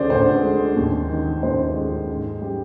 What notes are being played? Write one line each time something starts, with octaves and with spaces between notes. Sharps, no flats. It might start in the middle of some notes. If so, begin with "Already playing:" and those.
Already playing: D2 D3 G#4 C5 D5
D2 C5
G#3
D#2
D#3
D#2 C5
G#3
G#2
G3